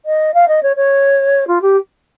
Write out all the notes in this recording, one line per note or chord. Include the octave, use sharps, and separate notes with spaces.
D#5
F5
D#5
C#5
C#5
F4
G4